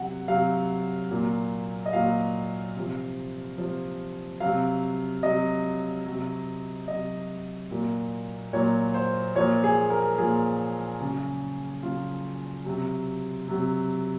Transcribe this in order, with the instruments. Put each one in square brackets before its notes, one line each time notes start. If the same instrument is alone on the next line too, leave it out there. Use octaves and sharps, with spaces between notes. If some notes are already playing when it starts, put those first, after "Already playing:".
Already playing: [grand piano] C3 F#3 F#5
C3 F#3 F5
A#2 F#3
D#5
A#2 F#3 F5
C3 F3
C3 F3
C3 F#3 F5
C3 F#3 D#5
C3 F#3
C3 F#3 D#5
A#2 F#3
A#2 F#3 C#5
C5
A#2 F3 C#5
G#4
A#4
A#2 F3 G#4
C#3 F#3
C#3 F#3 F4
C3 F#3
C3 F#3